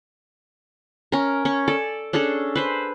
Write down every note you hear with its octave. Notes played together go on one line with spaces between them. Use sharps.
C#4 A#4
C#4 C#6
A4 D5
C#4 D4 G#4 A4
B4 C5